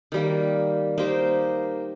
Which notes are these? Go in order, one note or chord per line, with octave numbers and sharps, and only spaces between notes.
D#3 G3 A#3
A#3 D#4 G4 C5